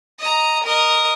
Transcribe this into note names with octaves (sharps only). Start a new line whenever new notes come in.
D#5 A#5
A#4 D#5